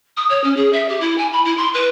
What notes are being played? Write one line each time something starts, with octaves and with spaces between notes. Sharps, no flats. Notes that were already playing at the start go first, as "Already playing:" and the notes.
D#6
C#5
C#4
G#4
E5
G4
E4
G#5
B5
E4
C6
B4